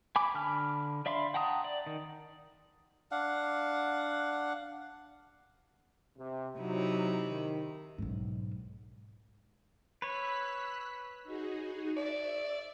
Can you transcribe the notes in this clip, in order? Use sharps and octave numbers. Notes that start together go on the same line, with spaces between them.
G#5 B5 D6
D3 A5 B5 F6
D5 E5 F5 B5 C6
F#5 G5 A5 A#5 D#6
D5
D#3
D4 F5 F#5
C3
C3 F#3 D#4 E4
D#3
B1 G#2
B4 C#5 E6 F#6 B6
D#4 F#4 G#4
D5 E5